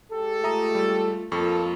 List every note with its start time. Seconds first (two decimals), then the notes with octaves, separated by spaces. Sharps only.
0.12 G#3 G4 A4
0.44 A3 F4 E5 A#5 D#6
0.75 G3
1.32 F2 A#3 F4 A4 C#6